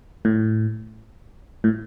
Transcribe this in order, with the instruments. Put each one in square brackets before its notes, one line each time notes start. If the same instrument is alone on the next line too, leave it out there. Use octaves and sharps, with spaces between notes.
[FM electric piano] A2
A2